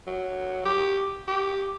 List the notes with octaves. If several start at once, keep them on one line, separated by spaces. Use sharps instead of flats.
F#3
G4
G4